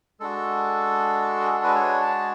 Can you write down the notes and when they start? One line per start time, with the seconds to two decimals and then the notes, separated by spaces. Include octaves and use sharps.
0.20 G#3 D4 F#4 A4
1.40 G#4
1.52 A4
1.64 B4
1.75 C#5
2.02 A5